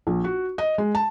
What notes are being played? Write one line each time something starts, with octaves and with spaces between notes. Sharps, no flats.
A#1
F#4
D#5
G#3
A5